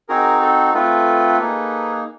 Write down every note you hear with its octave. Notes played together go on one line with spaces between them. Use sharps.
C4 D#4 F#4 G#4 A#4
A4
A3 C4 F4 A4 B4
A#3 D#4 G#4